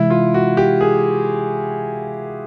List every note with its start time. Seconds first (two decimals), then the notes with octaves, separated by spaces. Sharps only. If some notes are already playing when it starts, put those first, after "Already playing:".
Already playing: C3 E3 G#3 E4
0.10 F4
0.34 F#4
0.57 G4
0.81 G#4